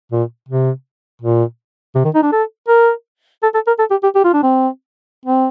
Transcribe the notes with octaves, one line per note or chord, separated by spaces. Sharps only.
A#2
C3
A#2
C3
D#3
D#4
D4
A4
A#4
A4
A4
A#4
A4
G4
G4
G4
F4
D4
C4
C4